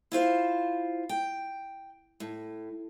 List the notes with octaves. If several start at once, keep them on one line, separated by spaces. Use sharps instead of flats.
E4 F4 C5 F5
G5
A2